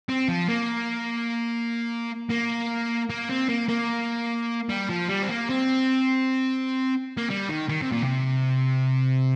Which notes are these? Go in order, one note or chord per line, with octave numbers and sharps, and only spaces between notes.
C4
F3
A#3
A#3
A#3
C4
A#3
A#3
G3
F3
G3
C4
A#3
C4
A#3
G3
D#3
D#3
C3
A#2
C3